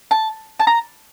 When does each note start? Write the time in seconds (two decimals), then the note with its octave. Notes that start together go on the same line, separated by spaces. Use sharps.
0.11 A5
0.60 A5
0.67 A#5